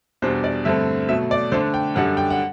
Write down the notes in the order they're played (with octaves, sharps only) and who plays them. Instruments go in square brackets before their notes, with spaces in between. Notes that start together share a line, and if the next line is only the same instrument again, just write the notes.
[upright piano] E2 B2 G3 D4 C5
D5
G2 D3 A3 C4 E5
B2 F#3 A3 E5
D5
D3 A3 D4 C5
G5
F#2 D3 G3 D4 F#5
G5
F#5